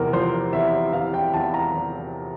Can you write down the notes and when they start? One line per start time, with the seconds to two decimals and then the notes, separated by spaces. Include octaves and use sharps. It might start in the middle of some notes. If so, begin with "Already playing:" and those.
Already playing: E2 C3 A#4
0.13 F3 C5
0.53 E2 E5
0.93 E2 F5
1.14 G5
1.34 E2 A5
1.54 A#5
1.74 E2